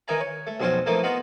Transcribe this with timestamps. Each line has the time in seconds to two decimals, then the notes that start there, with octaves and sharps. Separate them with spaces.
0.08 D#3 E3 D#4 G#5 A#5
0.20 C#5
0.47 A3
0.60 B1 F2 C4 C#4 F4 C5
0.86 E3 F3 A3 A#3 C4 D#4
1.03 B3 D#4 F4 F#4